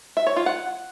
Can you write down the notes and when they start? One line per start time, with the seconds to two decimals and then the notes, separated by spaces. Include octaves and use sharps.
0.17 E5
0.27 C#5
0.36 F4
0.46 F#5